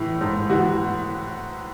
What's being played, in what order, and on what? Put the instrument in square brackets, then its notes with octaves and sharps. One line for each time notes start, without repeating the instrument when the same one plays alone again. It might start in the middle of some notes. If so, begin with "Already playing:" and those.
Already playing: [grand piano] A2 E3
G#2
E3 F#4